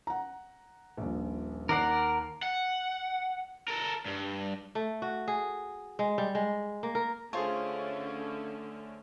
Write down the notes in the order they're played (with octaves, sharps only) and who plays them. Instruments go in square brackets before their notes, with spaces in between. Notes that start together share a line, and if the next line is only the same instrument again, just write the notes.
[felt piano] F#5 A#5
D#1 A#1
[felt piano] D#2 C7 [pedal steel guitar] A#4 D5 F#5
[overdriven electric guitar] F#5
A4 A#4
G2
[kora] A3
F#4
G#4
G#3
G3
G#3
A#3
A#4
[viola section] D3 A3 C#4 [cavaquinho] F4 C#5 [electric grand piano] G#4 C5 A5